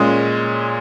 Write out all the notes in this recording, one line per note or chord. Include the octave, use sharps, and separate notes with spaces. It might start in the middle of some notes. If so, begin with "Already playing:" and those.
Already playing: A#2 G#3 C#4 D#6